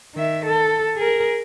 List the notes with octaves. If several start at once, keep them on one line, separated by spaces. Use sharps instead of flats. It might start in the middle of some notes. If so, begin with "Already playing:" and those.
D#3 E5
A4
G#4 A#4